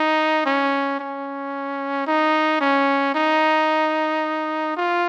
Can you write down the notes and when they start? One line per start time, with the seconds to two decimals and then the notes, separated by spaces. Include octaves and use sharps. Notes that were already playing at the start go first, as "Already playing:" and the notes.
Already playing: D#4
0.46 C#4
0.99 C#4
2.07 D#4
2.61 C#4
3.15 D#4
4.77 F4